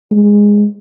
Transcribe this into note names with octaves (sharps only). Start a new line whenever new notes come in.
G#3